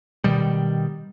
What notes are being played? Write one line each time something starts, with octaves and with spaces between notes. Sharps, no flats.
B2 D#3 G3